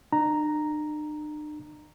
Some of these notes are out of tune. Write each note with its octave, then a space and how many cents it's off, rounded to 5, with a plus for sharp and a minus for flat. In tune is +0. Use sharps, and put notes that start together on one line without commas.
D4 +45 A#5 +0